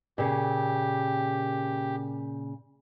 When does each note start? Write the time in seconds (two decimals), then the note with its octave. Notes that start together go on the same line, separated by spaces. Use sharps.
0.18 A#2 C#3 G4